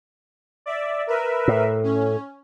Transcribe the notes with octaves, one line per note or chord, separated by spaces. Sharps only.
D5 E5
A#4 B4 E5
A2
C#4